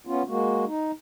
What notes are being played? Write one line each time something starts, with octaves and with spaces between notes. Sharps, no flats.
B3 C#4 F4
G#3 A#3 F#4
D#4